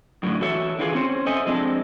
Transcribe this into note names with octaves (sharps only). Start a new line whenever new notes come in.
F#2 A2 D3
E3 F#4 A4 C#5 E5
D3 E3 F4 G#4
C4 C#4 C5
A4 C5 D#5 E5 G#5
F3 G#3 C4 D4 E4 A4